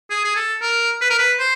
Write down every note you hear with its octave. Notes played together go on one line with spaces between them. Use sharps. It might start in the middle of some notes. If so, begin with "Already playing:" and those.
G#4
G#4
A4
A#4
B4
A#4
B4
C5